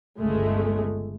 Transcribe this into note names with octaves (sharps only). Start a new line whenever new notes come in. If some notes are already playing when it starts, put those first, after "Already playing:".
G1 C#2 G#3 A3